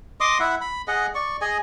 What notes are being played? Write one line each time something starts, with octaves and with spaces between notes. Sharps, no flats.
D#5 C6 D6 D#6
E4 E5 F#5
B5
G#4 D#5 F#5
D5 C#6
G#4 D#5 G#5